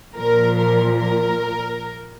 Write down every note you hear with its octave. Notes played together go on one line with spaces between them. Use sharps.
A#2 F3 A#4
A#4
A#4